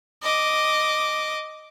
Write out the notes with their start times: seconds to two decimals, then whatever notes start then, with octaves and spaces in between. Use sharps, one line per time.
0.22 D#5 D6